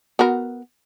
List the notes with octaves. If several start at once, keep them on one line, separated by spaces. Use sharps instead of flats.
B3 F#4 A#4